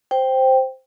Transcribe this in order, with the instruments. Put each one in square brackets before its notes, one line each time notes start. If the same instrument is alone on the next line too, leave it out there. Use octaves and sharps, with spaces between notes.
[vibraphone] C5 G5